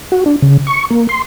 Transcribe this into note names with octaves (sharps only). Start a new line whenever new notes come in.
F#4
D4
C#3
C#6
A#3
C6